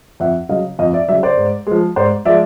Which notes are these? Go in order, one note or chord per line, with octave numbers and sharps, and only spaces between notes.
F2 E5 F#5
C#3 F#3 D#5 F5
F2 D#5 F5
D5 E5
C#3 F#3 D5 E5
C5 D5
G#2
F3 G#3
G#2 C5 D5
F3 G#3 D5 E5